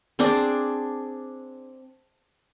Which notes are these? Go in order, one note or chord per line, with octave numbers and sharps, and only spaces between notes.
C4 D4 G#4 D5